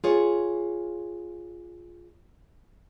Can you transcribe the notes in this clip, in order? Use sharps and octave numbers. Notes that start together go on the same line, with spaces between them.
F4 G#4 C#5